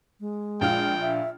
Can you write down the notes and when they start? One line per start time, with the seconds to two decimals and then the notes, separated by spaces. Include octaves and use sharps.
0.20 G#3
0.61 A#1 F4 G5 F6
1.01 E5